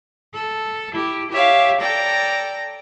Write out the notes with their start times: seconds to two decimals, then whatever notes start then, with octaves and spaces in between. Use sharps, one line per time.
0.33 A4
0.91 E4 G4
1.30 G4 C#5 E5 F5
1.80 A4 D5 G5 A#5